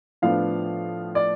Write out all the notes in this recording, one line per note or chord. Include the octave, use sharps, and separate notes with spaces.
A2 F3 B3 D4 F5
D5